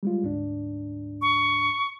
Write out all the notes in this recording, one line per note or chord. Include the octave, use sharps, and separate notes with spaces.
G3 G#3 F4
D2 G#2 D4
C#6